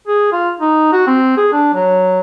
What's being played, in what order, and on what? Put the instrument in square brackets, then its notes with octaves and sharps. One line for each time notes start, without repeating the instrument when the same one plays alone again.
[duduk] G#4
F4
D#4
F#4
C4
G#4
D4
F#3